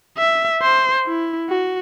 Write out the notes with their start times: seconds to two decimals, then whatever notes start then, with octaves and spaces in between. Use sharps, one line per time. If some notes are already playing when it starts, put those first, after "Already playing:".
0.18 E5
0.62 C5
1.07 E4
1.49 F#4